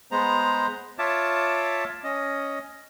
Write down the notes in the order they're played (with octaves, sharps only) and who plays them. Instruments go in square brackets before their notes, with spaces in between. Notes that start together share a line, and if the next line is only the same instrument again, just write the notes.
[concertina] G#3 B3 C5 A#5
F4 C#5 E5 A5 D6
C#4 D#5